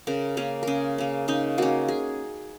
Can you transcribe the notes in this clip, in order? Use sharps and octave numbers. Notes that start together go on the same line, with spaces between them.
C#3 A#4
A#3 C#4
C#3 G#4 A#4
A#3 C#4
C#3 D#4
A#3 C#4 F#4
G#4